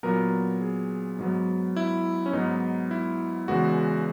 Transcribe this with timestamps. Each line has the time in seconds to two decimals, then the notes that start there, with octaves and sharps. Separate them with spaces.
0.03 A#2 F#3 B3 A#4
0.61 G#4
1.19 G#2 F#3 B3
1.76 E4
2.26 C#4
2.33 G#2 F#3 B3 D#4
2.91 E4
3.48 E2 C#3 G#3 B3 F#4